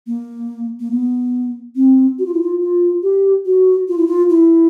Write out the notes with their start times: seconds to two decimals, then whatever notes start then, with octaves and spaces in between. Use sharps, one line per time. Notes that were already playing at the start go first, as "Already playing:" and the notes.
0.07 A#3
0.80 A#3
0.91 B3
1.76 C4
2.19 F#4
2.26 F4
2.34 E4
2.42 F4
2.61 F4
3.03 G4
3.46 F#4
3.88 F4
3.98 E4
4.07 F4
4.29 E4